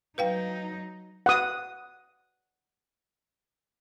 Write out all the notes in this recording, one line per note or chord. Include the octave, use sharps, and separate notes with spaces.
F#3 D#4 B4 F5 G5
F#5 D#6